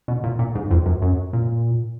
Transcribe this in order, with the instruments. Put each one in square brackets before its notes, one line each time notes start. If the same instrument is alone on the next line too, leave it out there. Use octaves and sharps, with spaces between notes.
[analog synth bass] B2
A#2
A#2
G#2
F2
F#2
F#2
A#2